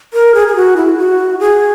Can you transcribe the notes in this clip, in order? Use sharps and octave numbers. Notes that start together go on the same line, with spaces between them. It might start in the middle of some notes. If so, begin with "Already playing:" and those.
A#4
G#4
G#4
F#4
E4
F#4
G#4